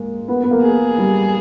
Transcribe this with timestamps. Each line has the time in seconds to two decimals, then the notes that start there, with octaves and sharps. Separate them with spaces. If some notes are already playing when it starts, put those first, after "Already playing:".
Already playing: G#3 A#3
0.28 B3
0.43 B3
0.51 A#3
0.63 G#4
0.98 G3